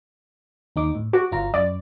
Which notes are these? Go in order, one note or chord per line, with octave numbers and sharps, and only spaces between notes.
D#2 D#4 D6
A2
F#4 D6
G1 F4 A#5
F#2 D5